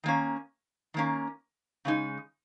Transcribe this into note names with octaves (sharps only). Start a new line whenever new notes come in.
D#3 A#3 C#4
D#3 A#3 C#4
C#3 G#3 D#4